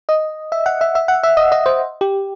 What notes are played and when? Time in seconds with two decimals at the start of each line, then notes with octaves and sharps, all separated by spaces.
0.09 D#5
0.52 E5
0.66 F#5
0.81 E5
0.95 E5
1.08 F#5
1.23 E5
1.37 D#5
1.52 D#5
1.66 C5
2.01 G4